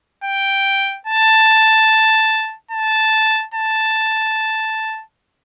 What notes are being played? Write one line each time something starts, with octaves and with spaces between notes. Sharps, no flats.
G5
A5
A5
A5